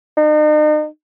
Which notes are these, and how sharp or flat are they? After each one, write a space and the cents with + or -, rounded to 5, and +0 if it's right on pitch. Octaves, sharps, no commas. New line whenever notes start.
D#4 -40